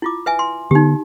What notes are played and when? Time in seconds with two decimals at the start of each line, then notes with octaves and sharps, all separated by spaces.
0.02 E4 F4 D6
0.26 B4 E5 G#5
0.39 C6
0.71 D3 B3 D#4 G4